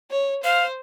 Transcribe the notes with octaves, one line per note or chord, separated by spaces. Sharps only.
C#5
C5 F5